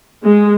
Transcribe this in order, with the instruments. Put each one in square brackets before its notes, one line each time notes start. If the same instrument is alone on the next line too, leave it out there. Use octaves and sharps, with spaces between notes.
[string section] G#3